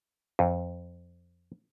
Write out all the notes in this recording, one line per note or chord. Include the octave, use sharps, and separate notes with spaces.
F2